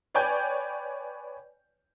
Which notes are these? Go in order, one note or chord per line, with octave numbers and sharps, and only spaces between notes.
B4 C#5 D5 G5 G#5 G6